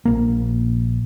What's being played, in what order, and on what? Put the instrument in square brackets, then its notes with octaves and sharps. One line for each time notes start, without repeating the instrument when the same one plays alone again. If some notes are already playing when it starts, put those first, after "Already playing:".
[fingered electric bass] A#1 A#3